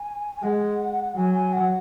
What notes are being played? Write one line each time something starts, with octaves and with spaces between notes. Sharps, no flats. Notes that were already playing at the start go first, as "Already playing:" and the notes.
Already playing: G#5
G#5
G#3 F#5
F#3 G#5
G#5
F#5